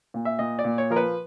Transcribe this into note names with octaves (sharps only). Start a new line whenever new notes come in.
A#2
E5
A#2 D#5
D5
A#2
C#5
F3 A#4
B4